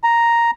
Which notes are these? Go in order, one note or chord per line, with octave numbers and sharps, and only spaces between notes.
A#5